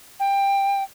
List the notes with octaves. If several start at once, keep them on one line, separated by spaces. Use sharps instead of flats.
G5